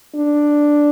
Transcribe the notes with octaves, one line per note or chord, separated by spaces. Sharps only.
D4